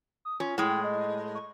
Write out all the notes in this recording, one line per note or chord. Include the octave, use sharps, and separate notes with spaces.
D#6
C#4 F4
A2 G#3 G5
D#5
C#6